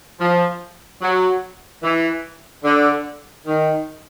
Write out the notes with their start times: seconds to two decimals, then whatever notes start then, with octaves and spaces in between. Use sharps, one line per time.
0.20 F3
1.02 F#3
1.83 E3
2.65 D3
3.47 D#3